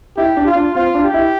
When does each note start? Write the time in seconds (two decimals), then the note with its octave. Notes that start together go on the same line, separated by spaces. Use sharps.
0.17 E4 G4
0.37 D4
0.46 F4
0.55 D4
0.75 C4 F4
0.94 D4
1.04 G4
1.14 E4